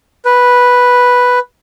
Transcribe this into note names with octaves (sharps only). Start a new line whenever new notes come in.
B4